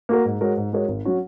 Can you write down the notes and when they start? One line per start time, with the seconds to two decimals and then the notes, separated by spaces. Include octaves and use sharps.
0.09 A#3 F#4 A#4
0.25 G#2
0.41 G#3 F#4 A#4 C#5
0.57 G#2
0.73 G#3 F#4 A#4 C#5
0.88 G#1
1.05 F#3 C#4 F#4